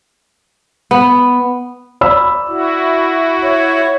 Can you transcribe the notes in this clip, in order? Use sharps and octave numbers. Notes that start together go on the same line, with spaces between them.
B3
D5 B5 E6
E4 F#4
C#5